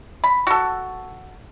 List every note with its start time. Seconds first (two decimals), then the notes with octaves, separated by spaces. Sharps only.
0.24 B5
0.47 F#4 A4